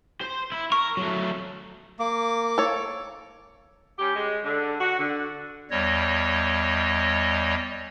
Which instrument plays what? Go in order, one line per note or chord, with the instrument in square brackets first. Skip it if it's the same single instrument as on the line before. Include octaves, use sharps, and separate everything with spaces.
[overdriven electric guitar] C5
E4
[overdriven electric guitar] A#4 [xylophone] C#6
[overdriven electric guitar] F#3 A3
[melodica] A#3 D6
[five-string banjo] A4 C#5
[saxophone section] G3 C#4 G4
G#3
D3
F#4
D3
[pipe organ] E2 G3 C#5 D#5